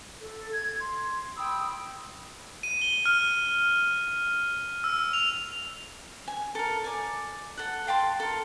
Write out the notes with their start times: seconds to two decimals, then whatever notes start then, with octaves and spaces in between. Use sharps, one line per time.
0.22 A4
0.53 G#6
0.79 C6
1.37 G5 B5 D#6 E6
2.63 D#7
2.82 G7
3.06 F6
4.84 E6
5.13 F7
6.28 G#5
6.55 A4 A#4
6.84 D5 G#5
7.57 A4 F#5
7.87 F5 G5 A5 C6
8.20 A4 A#4